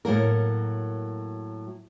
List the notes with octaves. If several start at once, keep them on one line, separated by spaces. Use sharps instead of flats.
A2 F#3 A#3 A#4